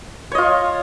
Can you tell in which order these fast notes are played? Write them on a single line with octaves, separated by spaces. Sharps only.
C#5 D#5 F4